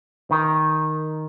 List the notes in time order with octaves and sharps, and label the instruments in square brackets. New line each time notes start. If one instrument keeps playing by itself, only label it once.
[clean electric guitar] D#3